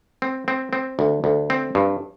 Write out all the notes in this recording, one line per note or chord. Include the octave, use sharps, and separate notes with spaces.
C4
C4
C4
D2
D2
C4
G2